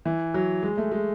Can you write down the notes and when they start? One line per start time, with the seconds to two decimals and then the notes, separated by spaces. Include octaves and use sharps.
0.06 E3
0.34 F#3
0.63 G#3
0.77 A3
0.91 G#3